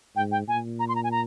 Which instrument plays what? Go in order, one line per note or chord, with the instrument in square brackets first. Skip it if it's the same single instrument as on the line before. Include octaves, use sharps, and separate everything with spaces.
[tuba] G#2 [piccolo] G5
[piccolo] G5
[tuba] A#2 [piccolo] G#5
[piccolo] A#5
C6
A#5
G#5
A#5